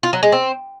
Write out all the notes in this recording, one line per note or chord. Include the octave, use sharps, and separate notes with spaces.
F4
F#3
G#3
C4